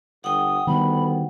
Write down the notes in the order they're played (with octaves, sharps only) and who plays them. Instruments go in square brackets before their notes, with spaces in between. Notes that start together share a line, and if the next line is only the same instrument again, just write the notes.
[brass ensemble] G1 [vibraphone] F#5 G5 [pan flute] D#6
[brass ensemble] D2 B3 [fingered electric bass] D#3 G3 [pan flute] B5